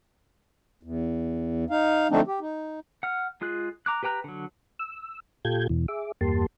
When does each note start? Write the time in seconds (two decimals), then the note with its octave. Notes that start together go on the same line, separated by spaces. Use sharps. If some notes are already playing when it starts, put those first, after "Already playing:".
0.83 E2
1.70 D#4 F5
2.11 D3 F3 A3 C4 D4 D#4
2.27 G4
2.41 D#4
3.03 F#5 F6
3.41 G#3 F4 G#4 F#6
3.86 A#5 D6 F#6
4.03 G4 B4 G5 A#5 F#6
4.24 D3 F#3
4.79 E6
5.45 A#2 F4 G4 A4 G6 G#6
5.69 E2 B2 E3
5.88 G#4 E5 D6
6.21 E2 G2 A#3 G4 A5 C6